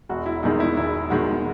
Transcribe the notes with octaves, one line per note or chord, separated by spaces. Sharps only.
E1 F#4
E4
E2 D#3 G#3 D#4
E4
E1 E4
E2 D#3 G#3 F#4